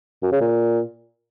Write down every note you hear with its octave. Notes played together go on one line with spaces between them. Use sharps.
F#2
C#3
A#2